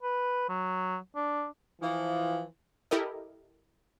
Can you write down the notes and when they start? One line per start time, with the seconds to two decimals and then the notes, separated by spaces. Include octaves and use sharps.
0.03 B4
0.49 F#3
1.16 D4
1.81 E3 F3
2.91 E4 G4 A4 A#4 D#5